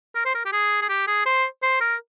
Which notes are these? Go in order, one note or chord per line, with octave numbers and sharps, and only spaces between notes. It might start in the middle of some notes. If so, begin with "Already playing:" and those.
A#4
C5
A#4
G4
G#4
G#4
G4
G#4
C5
C5
A#4